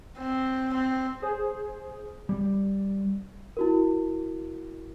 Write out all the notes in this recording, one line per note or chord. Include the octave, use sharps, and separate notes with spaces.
C4
C4
G#4 C5
G3
E4 F#4 A#4